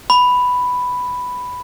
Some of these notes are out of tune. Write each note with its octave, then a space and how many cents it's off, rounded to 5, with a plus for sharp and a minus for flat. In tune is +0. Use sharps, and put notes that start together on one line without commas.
B5 +5